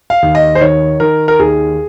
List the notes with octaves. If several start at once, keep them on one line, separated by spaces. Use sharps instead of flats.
F5
D#2
D#5
C5
D#3 C#5
D#3 A#4
A#4
D#2 G#4